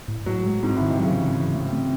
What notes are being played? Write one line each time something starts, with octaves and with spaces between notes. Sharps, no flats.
A2
A2 F#3
G#3
G#2 C4
A2
D#3
C3
C#3 F#3
E3
E3
A3
C4